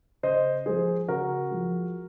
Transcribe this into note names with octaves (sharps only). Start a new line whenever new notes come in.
C#3 C5 D#5
F3 G#3 G#4 C5
C#3 F#4 A#4
F3 G#3